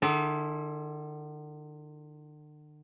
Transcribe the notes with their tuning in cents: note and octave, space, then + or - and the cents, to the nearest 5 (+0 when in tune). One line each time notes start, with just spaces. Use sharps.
D3 +45 E4 +0 A4 -40